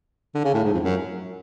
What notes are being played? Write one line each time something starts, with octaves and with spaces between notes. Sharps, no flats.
D3
C#3
A2
G#2
F2
F#2